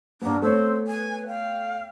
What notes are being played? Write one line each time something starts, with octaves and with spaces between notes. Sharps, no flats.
G2 A#3 B3 D4
A3 B3 C4 C5 C#5
B4 G#5
F5 G5